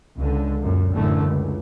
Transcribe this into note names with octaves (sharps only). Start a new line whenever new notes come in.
C#2 D3
F#2 A#2
A1 F#2 D3 E3 A3
C#2